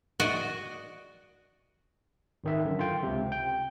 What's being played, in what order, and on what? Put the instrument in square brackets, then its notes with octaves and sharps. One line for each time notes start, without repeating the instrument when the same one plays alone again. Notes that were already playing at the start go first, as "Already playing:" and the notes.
[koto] F#4 D5 D#5
[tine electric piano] G#1 D#3 E5
F#2 D3
F4 G5
C#2 C3
G5